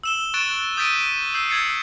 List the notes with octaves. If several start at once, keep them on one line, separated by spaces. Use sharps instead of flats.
E6 E7 G7
C#6 F#6 A6 D7 E7 G7
D#6 G6 A6 B6 D7 D#7
E6 G6 C7
E6 G#6 A6 C7 C#7